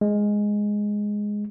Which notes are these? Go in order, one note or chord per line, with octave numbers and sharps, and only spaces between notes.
G#3